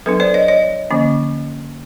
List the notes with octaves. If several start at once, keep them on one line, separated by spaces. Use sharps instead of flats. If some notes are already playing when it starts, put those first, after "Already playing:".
F#3 B3 D4 A4 B4
C5 D5
C#5 D#5
C#5 D#5
D3 F3 A#3 C#4